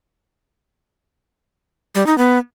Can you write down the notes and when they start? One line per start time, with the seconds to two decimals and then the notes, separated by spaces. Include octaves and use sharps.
1.95 G3
2.07 D#4
2.18 B3